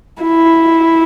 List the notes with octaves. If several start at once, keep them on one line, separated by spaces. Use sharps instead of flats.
E4